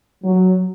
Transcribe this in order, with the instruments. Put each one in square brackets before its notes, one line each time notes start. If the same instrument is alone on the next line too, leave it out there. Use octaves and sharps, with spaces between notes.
[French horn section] F#3